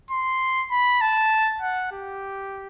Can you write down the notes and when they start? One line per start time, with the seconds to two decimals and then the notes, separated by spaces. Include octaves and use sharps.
0.11 C6
0.71 B5
1.01 A5
1.62 F#5
1.92 G4